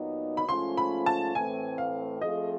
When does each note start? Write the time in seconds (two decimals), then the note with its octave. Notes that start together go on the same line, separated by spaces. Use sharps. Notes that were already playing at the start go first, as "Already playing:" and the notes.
Already playing: A#2 F#3 B3 D#4
0.37 B5
0.48 G#2 F3 A3 C#4 F4 C6
0.77 B5
1.06 A5
1.35 A2 E3 A3 C4 G#5
1.78 F5
2.21 F3 A3 C4 F4 G#4 D#5